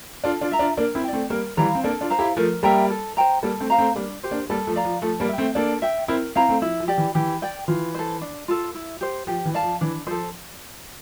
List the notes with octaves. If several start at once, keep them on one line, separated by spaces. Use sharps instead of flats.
D4 F4 A4
D4 F4
E5 A#5
D4 F4
A#3 D4 A#4
C4 E4
D5 G5
A3 C4
G3 A#3 A#4
E3 G3 F5 A#5
C4
A#3 D4 A4
D4 F4
C5 F5 A#5
E4 G4
F3 A3 A#4
G3 A#3 E5 G5 A#5
A4
C5 G5 A#5
G3 A#3 A4
A3 C4
C5 F5 A#5
A3 C4
G3 A#3 D4
G4 C5
A#3 D4
G3 A#3 A4
F3 A3
D5 F5 A#5
F3
F3 A3 A4
G3 A#3
E5 G5
A3 C4
A#3 D4 A4
E5 G5
C4 E4 A#4
C4 E4 F5 A#5
A3 C4
F3 E4
F3
G4 D5
E3
E3 G4
D5 G5
E3 F4
A4 C5
D4
F4 A4
E4
G4 C5
F3 G4
E3
D5 F5 A5
F3
E3 D4
F3 A4 C5